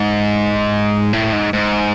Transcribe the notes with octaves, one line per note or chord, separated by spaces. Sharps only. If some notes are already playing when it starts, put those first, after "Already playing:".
Already playing: G#2
A2
G#2
G#2